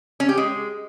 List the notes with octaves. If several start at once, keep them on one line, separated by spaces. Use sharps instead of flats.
C#4
G4
G#3